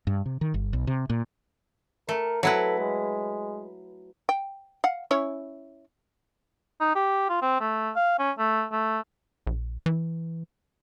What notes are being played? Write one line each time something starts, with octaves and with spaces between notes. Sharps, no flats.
G2
C3
D#3
G1
B1
C3
A#2
A3 A#4
F#3 E4 A4 B4
G#3
G5
F5 F#5
C#4 E4 C#5
D#4
G4
F4
C4
A3
F5
C#4
A3
A3
A#1
E3